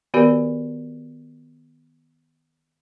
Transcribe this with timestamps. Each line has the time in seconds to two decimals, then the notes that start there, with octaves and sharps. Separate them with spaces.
0.14 D#3 B3 F#4 G4 A#4 D5